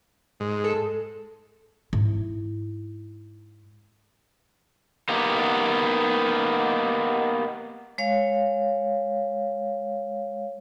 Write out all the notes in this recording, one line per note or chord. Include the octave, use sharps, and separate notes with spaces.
G#2
A4
G#2 E4
A#3 B3 D#4 G4
G#3 C#5 F5